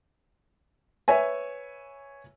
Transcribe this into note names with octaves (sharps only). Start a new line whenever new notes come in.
B4 C#5 E5 G#5